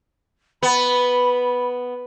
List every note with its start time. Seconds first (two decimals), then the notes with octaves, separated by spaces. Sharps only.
0.63 B3 B5